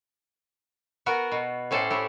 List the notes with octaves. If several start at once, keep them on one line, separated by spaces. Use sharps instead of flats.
B3 F#4 A#4
B2
A2 C#4 A4 C5 D5
A3 E4 G4